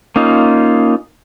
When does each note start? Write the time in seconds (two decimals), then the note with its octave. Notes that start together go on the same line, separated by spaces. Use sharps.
0.16 A#3 C#4 D#4 F4